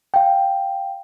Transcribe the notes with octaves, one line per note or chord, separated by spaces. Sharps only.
F5 G5